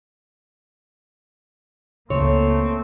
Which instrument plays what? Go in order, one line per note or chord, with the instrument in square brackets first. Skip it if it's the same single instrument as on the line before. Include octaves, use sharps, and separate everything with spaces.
[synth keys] C#2 C#3 [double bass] A3 A#3 [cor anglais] C4 [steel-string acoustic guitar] C#5